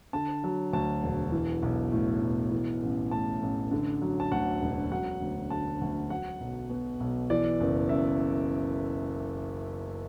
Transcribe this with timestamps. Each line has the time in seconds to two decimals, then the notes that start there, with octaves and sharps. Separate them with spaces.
0.13 D3 A5
0.44 F#3
0.73 D2 A5
1.03 E1
1.32 E3
1.63 B1
1.92 A2
2.22 B1
2.52 E3
2.83 A1
3.11 A2 A5
3.42 A1
3.71 D3
4.02 F#3
4.20 A5
4.32 D2 F#5
4.61 E1
4.92 F#3 F#5
5.22 D2
5.50 D3 A5
5.81 D2
6.10 F#3 F#5
6.41 B1
6.70 B2
7.00 B1
7.30 E3 D5
7.60 F#1
7.89 F#2 E5